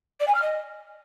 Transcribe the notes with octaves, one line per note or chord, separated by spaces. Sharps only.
D5
G#5
F6
D#5